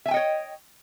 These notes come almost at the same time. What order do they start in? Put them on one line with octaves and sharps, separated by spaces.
E5 G#5 G5 D#5 C#5